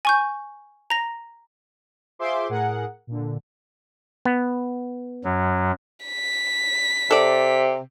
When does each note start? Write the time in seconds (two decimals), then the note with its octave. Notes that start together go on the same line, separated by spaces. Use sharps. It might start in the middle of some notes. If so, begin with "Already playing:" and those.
0.05 G#5 C#6 G6
0.90 A#5 A#6
2.19 F4 G#4 C5 E5 C6 D6
2.49 A2 G#4 A#4 F#5
3.07 A#2 D3
4.25 B3
5.24 F#2 F#3
6.06 B6
7.11 C3 A4 D5